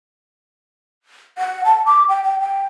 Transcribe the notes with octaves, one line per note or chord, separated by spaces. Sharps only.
F#5
A5
D6
G5
G5
G5